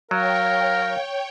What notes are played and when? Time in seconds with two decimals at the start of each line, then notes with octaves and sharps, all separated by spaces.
0.11 F#3 A#4 C#5 F5 G5